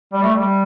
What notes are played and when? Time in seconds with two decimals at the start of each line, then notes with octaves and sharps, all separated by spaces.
0.13 G3
0.23 A3
0.35 G3